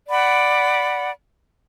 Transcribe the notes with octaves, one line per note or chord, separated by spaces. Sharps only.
D5 F#5 B5